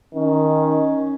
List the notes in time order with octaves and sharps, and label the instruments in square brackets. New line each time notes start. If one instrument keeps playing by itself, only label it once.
[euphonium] D#3 [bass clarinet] C#4